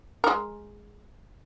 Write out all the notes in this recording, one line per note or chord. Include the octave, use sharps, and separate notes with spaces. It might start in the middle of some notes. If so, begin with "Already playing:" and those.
G#3 A#4